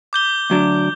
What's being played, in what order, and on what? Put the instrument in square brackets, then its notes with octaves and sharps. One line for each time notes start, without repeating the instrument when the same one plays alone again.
[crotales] D6 G6 G7
[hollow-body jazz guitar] D2 F#3 D4